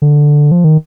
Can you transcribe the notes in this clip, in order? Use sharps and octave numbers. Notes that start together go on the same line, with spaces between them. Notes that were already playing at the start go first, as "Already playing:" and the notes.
D3
F3
D#3